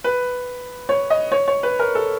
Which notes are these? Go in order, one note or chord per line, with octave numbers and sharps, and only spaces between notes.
B4
C#5
D#5
C#5
C#5
B4
A#4
A4